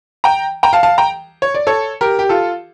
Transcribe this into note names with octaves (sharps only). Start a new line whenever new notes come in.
G5 A#5
G5 A#5
F5 A5
F5 A5
G5 A#5
C#5
D5
A4 C#5
G4 A#4
G4
F4 A4